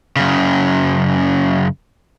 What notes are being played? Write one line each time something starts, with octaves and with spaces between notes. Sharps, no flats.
F#2 C#3